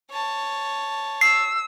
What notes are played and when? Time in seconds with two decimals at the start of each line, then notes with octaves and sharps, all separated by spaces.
0.10 C#5 A5
1.21 E6 C7